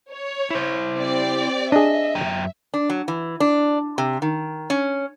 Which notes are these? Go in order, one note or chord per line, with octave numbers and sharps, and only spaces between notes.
C#5
E4 C5
C4 G4 D5
D4 G#4 D#5 E5
F#2 G5 A#5
D4
F#3
E3
D4
C3
D#3
C#4